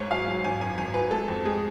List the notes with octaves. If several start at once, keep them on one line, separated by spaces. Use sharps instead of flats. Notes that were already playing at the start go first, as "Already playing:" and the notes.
Already playing: G#1 G#2 C#5
F#3 F5
F#3
G#1 G#5
F#2 G#5
G#1 G#5
F#3 B4
G#3 A4
F2
G#3 G#4